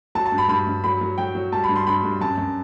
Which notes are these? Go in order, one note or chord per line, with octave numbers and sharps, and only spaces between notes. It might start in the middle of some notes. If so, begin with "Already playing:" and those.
F#3 A5
A5
G2
B5
G2 B5
G2
F#3 B5
F#3
F#3 G5
F#3
G3 A5
B5
G2
C6
G2 B5
G2
F#2 A5
F#2